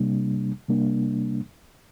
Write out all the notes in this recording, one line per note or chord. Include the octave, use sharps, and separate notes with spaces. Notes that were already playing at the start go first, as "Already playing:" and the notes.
Already playing: C3 G3 A#3 D4
C3 G3 A#3 D4